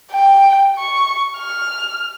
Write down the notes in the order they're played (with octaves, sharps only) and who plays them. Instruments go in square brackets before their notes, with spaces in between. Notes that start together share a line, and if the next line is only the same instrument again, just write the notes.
[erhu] G5
C#6
F6